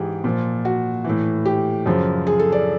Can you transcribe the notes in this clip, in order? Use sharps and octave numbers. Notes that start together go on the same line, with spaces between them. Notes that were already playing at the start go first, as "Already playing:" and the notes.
Already playing: G#2 E3 G4 G#4
A#2 F3
F#4
A2 E3
G4
F#2 C#3 F3
G#4
A4
D5